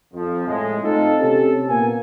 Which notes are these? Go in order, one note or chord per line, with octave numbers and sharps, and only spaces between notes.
F2 F3
A2 G#3
A3 C4 D#4 F4 A4
C3 C#4 G4 A4
A#2 A#3 B3 G#5